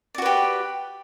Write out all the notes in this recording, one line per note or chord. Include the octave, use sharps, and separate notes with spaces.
F#4 G4 B4 D5